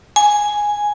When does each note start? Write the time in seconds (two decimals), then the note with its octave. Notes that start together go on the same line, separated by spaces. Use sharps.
0.16 G#5